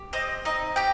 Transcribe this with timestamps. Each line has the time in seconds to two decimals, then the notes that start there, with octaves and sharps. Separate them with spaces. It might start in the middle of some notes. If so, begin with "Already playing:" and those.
Already playing: G4
0.13 C4 D#5
0.45 D#4 D#5
0.76 G4 G5